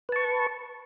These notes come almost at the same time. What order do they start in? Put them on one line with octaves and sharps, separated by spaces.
B4 A5 C#6